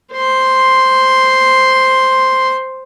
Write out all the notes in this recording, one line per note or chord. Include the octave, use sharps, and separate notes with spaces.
C5 C6